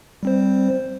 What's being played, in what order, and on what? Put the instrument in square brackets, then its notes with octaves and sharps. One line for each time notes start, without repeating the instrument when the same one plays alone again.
[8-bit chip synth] G3 C4 C5